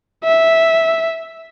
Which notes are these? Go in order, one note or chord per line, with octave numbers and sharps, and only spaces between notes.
E5